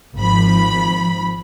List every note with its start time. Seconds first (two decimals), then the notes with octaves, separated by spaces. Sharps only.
0.17 G#1 F3 B5